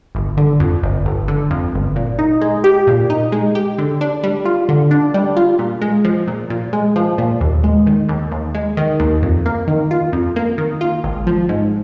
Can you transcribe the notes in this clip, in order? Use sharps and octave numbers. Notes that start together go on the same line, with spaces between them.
G1
D3
F2
G1
G1
D3
F2
G1
A#2
D#4
G#3
G4
A#2
D#4
G#3
G4
D3
D4
G3
F4
D3
D4
G3
F4
A#2
G#3
F3
A#2
A#2
G#3
F3
A#2
D#2
G#3
D#3
D#2
D#2
G#3
D#3
D#2
F2
A#3
D#3
F4
F2
A#3
D#3
F4
G#1
F3
G#2